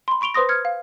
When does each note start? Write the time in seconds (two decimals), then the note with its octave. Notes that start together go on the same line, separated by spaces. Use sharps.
0.08 B5 C6
0.21 B5 C#6 D7 F7 G7
0.34 B4 C5 C6 D#6 A#6
0.49 F6 G#6 C#7
0.65 F5